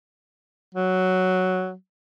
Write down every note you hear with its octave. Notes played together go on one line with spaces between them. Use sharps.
F#3